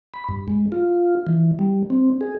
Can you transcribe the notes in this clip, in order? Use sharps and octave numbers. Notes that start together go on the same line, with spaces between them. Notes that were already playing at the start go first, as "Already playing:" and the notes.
B5
G2
G#3
F4
E3
G3
C4
G#4